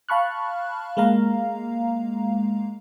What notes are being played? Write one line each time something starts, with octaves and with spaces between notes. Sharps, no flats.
F5 A5 B5 C#6 F6 F#6
G#3 A#3 F5 A#5